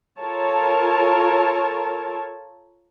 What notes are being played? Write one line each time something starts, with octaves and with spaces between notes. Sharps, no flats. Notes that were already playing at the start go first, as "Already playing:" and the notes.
F4 A4 A#4 C#5 A5